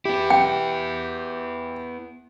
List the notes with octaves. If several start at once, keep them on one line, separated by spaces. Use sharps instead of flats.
B3 E4 G4
G5